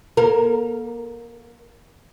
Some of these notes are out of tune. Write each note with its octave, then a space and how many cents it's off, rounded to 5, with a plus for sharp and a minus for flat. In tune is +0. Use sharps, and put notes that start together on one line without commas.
A#3 +35 A#4 +0